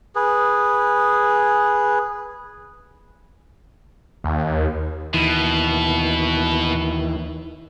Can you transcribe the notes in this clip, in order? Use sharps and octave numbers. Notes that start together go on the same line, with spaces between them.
G#4 B4
D#2
D#2 B2 E3